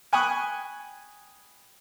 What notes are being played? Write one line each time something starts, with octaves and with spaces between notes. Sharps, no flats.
G5 G#5 B5 C#6 D#6 F#6